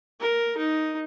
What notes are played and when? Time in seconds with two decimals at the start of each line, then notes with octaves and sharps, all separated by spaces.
0.20 A#4
0.57 D#4